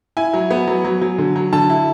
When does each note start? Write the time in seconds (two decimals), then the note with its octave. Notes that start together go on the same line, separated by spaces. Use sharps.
0.17 E4 G#5
0.34 F#3
0.51 B3
0.67 F#3
0.84 F#3
1.01 F#3
1.18 D3
1.36 F#3
1.53 D3 A5
1.70 E4